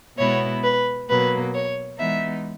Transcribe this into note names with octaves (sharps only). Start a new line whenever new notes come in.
B2 G#3 B3 E4 C#5
B4
B2 F#3 A#3 B4
C#5
E3 G#3 B3 D#4 E5